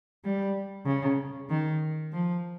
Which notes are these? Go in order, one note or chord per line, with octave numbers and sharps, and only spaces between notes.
G3
C#3
D#3
F3